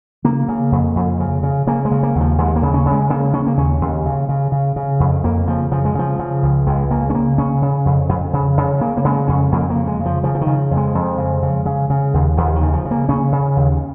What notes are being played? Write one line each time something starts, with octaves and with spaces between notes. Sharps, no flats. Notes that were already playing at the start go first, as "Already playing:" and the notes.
C#3 A#3
C#3
F2
F2
C#3
C#3
C#3 A#3
G#3
C#3
A#3
D#2
F3
D#2 G#3
A#3
C#3
C#4
C#3
G#3
C#3 A#3
C#3 C#4
A#3
D#2 C#4
D#2
C#3
C#3
C#3
C#3
F2
F2 A#3
C#3 F3
C#3 F3
G#3
C#3 F3
C#3
C#2
C#2 G#3
C#3 A#3
C#4
C#3 A#3
C#3 C#4
C#3
F2
F2
C#3
C#3
C#3 A#3
A#3
C#3 G#3
F2 C#4
F2 A#3
A#3
C#3
G#3
C#3
F3
C#3 F3
F3
D#3
C#3
F2
G#3
F2
C#3
C#3
C#3
C#3
D#2
D#2 F3
D#3
C#3
F3
C#3
A#3
C#3 C#4
C#3
D#2